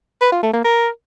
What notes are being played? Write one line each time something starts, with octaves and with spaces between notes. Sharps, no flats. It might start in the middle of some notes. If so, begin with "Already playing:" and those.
B4
F4
A3
A#3
A#4